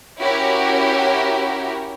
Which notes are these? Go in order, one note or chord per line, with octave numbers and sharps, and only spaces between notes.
C#4 E4 F#4 G4 A#4 C#5